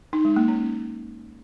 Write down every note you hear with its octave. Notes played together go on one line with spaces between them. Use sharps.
D#4
G#3
A#3
C#4